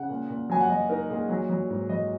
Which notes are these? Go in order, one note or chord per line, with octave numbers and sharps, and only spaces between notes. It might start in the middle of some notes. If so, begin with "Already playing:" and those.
Already playing: C#3 F#5
A#2
A#2
F#3 G#5
F#5
F#3 D#5
D#4 A#4
A#2 G#4
F#3
F#3
G#2
F#3 D#5